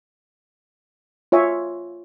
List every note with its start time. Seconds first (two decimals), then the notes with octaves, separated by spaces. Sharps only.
1.32 F4 C#5 E5 G#5